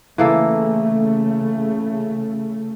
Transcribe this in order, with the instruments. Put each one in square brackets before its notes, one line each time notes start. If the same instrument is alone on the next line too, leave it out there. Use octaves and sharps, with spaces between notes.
[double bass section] C#3 A3 [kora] E3 A#3 A4